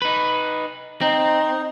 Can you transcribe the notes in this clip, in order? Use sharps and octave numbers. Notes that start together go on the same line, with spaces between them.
D#4 B4
C4 D#4